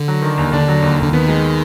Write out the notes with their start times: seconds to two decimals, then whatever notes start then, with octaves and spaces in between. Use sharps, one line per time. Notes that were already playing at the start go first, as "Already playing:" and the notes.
Already playing: D3
0.08 F#3
0.22 D#3
0.38 D#2
0.53 D3 D4
0.68 F#3
0.82 D#2
0.98 D#2 D3
1.13 D#3 B3
1.29 G#3